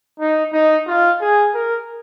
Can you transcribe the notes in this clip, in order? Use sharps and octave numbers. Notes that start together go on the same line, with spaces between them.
D#4
D#4
F4
G#4
A#4